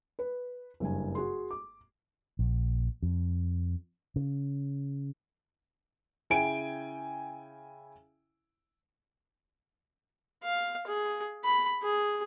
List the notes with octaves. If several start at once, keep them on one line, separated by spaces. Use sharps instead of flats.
B4
F#1 G2 G#5
F#4 G#4 C6
D6
A#1
F2
C#3
C#3 E4 G5 G#5 D7
F5
G#4
B5
G#4